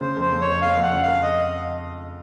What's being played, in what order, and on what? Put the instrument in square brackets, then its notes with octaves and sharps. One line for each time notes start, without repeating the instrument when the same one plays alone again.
[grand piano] C#3 [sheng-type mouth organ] C5
[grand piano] F2 [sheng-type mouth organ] C5
[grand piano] F2
[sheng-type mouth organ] C#5
[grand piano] F2
[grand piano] F2 [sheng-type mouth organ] F5
[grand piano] F2
[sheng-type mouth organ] F#5
[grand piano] C#3
[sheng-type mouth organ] F5
[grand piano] F2
[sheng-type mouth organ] D#5